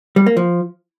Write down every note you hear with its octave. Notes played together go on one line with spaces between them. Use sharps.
G3
A#3
F3